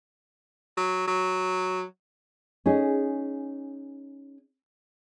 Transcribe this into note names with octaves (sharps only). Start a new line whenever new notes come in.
F#3
F#3
C#4 D#4 G#4